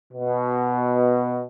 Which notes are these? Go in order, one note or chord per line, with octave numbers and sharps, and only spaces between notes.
B2